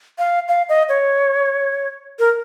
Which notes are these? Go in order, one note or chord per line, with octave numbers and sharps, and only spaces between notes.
F5
F5
D#5
C#5
A#4